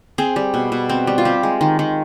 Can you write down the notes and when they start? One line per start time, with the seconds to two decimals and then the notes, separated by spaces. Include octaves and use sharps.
0.18 C4 G#4
0.36 G3
0.54 B2
0.72 B2
0.89 C4
1.07 G3
1.18 F4
1.25 C4 G4
1.43 G#3
1.61 D#3
1.79 D#3